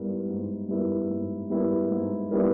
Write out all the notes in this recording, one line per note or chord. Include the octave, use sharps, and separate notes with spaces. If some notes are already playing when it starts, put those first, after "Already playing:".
Already playing: G#2 G3 B3 E4 A#4
G#2
G3 B3 E4 A#4
G#2
G3 B3 E4 A#4
G#2
G3 B3 E4 A#4